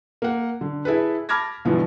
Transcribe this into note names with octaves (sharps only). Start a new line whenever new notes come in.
A#3 F#5
D3
E4 G#4 A4 B4
A5 B5 D6 F6 G#6 A#6
G2 B2 D3 E3 F3